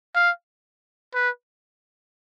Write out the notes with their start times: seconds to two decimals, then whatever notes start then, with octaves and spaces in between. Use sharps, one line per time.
0.15 F5
1.14 B4